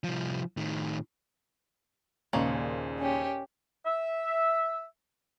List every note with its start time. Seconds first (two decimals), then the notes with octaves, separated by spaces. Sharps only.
0.04 C2 F3
0.57 A2 D#3
2.33 D#2 A#2 C#3 G#3 A#3 G#4 C5 C#5
3.00 C#4 G4
3.86 E5